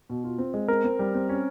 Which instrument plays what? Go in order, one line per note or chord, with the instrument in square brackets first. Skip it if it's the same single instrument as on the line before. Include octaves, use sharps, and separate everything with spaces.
[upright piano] B2
F4
C4
G#3
[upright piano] C4 [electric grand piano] A#4
[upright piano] C4
G3
C4
C#4